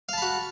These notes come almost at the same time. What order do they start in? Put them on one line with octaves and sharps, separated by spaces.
F5 A5 B5 F#4